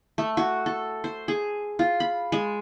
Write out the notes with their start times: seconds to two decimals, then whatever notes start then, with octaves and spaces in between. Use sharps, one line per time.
0.18 A3
0.37 F#4
0.66 A4
1.04 C5
1.28 G#4
1.79 F4
2.00 B5
2.32 G#3